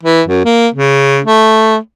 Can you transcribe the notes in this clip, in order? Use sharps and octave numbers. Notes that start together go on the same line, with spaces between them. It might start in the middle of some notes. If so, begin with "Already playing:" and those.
E3
F#2
A#3
C#3
A3